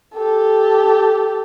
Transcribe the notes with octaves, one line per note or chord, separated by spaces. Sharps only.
G4 A4